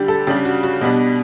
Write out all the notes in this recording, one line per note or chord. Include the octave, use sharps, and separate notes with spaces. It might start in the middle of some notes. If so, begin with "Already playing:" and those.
Already playing: D3 G3 D4 G4
A4
C#3 G3 D4 G4
F#4
F#4
B2 G3 B3 D4